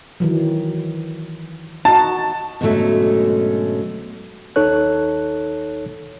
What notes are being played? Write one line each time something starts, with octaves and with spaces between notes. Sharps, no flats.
D#3 E3 F#3
D#4 F#4 A5
G#2 B2 D3 F#3 A3 C#4
D#2 D#4 A4 C#5 F#6